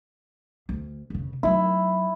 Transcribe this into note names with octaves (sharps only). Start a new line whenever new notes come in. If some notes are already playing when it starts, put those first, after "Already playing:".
D2
F1 C#3
F#3 A3 E4